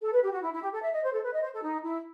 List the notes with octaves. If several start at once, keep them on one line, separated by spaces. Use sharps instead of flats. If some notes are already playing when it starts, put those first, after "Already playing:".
A4
B4
G4
F#4
E4
E4
G4
A4
E5
D#5
C5
A4
B4
D#5
C5
A4
D#4
E4